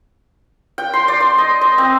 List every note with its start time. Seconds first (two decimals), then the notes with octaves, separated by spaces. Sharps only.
0.78 G5
0.94 C6
1.08 D5
1.20 C6
1.38 D#5
1.61 D#5
1.78 C4